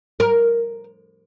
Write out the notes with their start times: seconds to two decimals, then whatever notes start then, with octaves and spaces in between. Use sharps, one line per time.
0.20 A#4